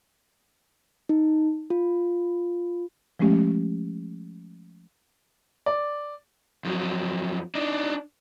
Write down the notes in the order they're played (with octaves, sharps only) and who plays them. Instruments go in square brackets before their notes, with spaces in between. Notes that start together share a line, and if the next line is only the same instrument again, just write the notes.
[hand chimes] D#4
F4
[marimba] F3 G#3 A3 C#4 G4
[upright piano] D5
[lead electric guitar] F2 F#3
D4 D#4